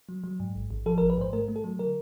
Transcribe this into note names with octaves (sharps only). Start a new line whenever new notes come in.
F#3
F#3
G#2
A1
A1
F3 A4
A#4
A1
B4
G#2 C5
A3 A#4
A3
A4
F#3
D3 A#4